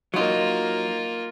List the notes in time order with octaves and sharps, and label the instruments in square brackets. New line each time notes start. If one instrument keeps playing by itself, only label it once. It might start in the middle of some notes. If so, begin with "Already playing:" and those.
[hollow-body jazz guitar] F#3 D#4 [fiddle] A#3 F4